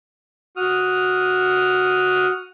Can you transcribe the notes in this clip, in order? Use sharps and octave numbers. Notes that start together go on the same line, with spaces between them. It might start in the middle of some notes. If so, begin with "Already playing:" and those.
F#4 D#6 F6